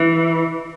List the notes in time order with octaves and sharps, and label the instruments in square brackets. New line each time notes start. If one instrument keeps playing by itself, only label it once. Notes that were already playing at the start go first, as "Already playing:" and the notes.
Already playing: [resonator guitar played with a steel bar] E3